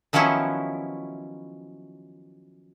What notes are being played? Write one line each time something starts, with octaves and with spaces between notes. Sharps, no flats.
D#3 F3 F#3 B3 C#4 E4